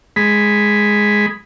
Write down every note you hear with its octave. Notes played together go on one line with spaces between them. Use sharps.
G#3 B5